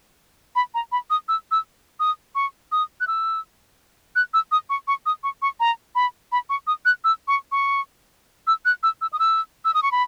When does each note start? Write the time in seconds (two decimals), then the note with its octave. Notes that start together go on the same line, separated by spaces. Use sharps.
0.56 B5
0.74 A#5
0.92 B5
1.10 D#6
1.28 E6
1.51 E6
2.00 D#6
2.35 C#6
2.72 D#6
3.01 F#6
3.07 E6
4.16 F#6
4.34 E6
4.52 D#6
4.70 C#6
4.88 C#6
5.06 D#6
5.24 C#6
5.42 C#6
5.60 A#5
5.95 B5
6.32 B5
6.50 C#6
6.67 D#6
6.85 F#6
7.04 E6
7.28 C#6
7.52 C#6
8.47 E6
8.65 F#6
8.83 E6
9.01 E6
9.13 D#6
9.19 E6
9.65 E6
9.74 D#6
9.83 C#6
9.92 B5